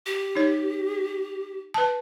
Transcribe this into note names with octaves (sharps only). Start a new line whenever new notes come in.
G4
D#4 C#5
B4 A5